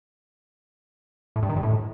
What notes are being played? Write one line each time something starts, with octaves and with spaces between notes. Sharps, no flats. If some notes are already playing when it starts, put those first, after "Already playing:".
A2
G2
D#3
G2
A2